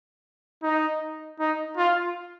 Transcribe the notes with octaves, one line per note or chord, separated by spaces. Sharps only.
D#4
D#4
F4